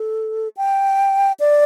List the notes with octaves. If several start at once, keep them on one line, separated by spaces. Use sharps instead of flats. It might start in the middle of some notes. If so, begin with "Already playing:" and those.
Already playing: A4
G5
D5